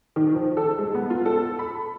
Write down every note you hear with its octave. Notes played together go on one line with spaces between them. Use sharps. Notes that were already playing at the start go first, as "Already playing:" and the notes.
D#3
F3
A4
G#3
B3
F4
A4
B5